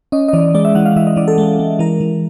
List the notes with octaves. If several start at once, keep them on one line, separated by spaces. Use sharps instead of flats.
C#4 D#5
D#5
E3 D5
G#3 D5
E5
E3 F#5
F5
E3 E5
D#5
E3 D5
A4
G#3
G#3
E3 A#4
E3